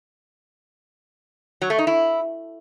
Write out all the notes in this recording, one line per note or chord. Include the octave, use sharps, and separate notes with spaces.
F#3
A3
D#4
E4